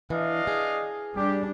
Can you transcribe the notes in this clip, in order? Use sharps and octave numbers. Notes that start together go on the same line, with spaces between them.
E3 D4 D#5 F5
G#4
G3 D4 G4